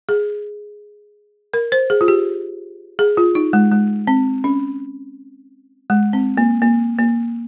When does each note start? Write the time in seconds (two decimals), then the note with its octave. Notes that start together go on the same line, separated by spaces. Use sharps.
0.09 G#4
1.54 A#4
1.72 C5
1.90 G#4
2.01 F4
2.08 G4
2.99 G#4
3.17 F4
3.35 D#4
3.53 G#3
3.71 G#3
4.07 C4
4.44 C#4
5.90 G#3
6.13 C4
6.37 A#3
6.62 A#3
6.99 A#3